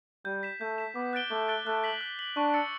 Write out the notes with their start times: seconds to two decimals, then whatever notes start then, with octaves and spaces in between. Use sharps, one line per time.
0.25 G3 G6
0.43 B6 E7
0.61 A3 G6
0.78 B6 E7
0.95 B3 D6
1.13 F#6 A6 D7 G7
1.31 A3 D6
1.48 F#6 A6 D7 G7
1.66 A3 F#6
1.84 B6 F#7
2.01 F#6
2.19 B6 F#7
2.36 D4 C#6
2.54 E6 A6 C#7